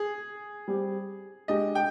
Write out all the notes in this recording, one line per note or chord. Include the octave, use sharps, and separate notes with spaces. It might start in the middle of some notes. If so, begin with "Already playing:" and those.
Already playing: G#4
G3 C4 G4
G#3 D4 G4 D#5
G5